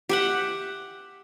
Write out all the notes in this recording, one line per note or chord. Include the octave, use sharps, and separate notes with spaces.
G4 E5 F#5